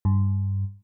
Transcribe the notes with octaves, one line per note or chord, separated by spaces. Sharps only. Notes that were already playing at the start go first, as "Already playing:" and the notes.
G2